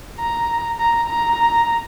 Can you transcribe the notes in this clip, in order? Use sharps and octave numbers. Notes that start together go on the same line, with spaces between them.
A#5
A#5
A#5